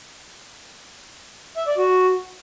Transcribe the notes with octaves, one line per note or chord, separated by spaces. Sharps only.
E5
D5
F#4